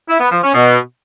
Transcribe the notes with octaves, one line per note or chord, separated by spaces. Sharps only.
E4
B3
F3
C#4
B2